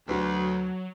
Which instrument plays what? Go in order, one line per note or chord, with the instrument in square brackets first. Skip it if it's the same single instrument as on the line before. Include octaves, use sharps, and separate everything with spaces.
[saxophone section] D2 [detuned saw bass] F#3 [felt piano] F#4 B4